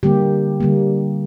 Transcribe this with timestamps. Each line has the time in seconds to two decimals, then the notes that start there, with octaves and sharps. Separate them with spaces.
0.03 D3 G3 A#3 G4
0.60 D3 G3 A#3